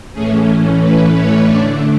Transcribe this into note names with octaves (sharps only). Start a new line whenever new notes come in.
A2 E3 A3 C#4 G#4
B4
C#5
D3 A3 D4 D5